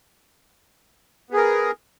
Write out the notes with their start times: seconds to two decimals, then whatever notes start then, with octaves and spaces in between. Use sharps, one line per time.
1.30 B3
1.34 G#4
1.37 A#4